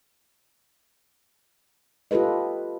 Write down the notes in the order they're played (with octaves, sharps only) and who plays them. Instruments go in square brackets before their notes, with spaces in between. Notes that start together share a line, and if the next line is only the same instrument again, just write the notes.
[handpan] F4 G4 A4 B4 D#5